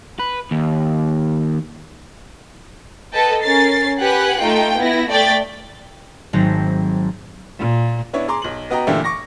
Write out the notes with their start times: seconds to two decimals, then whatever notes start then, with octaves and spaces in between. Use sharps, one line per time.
0.19 B4
0.51 D#2
3.12 A4 B4 D#5 G5 A5
3.42 C#4 A#4 A6 C7
4.00 G4 B4 F#5 G#5 F#6
4.39 A3 D#4 F4 G5
4.77 B3 E4 A#6
5.09 A3 D5 G5 A6 B6
6.33 G#1 F#3 A3 C4 A#6
7.59 A#2
8.13 B3 D4 E4 C#5
8.28 G#4 A#5 C6 D6
8.42 B1 F#7
8.70 B3 F#4 D#5 G5 A#5
8.87 A#2 D3 E3 A3 E4 G4
9.04 C#6 D6 A#6